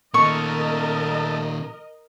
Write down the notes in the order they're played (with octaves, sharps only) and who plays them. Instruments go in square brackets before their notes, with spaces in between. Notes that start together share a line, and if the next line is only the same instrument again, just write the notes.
[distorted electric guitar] A#2 D#3 [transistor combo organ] A3 A4 [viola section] A#4 D#5 [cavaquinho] C#6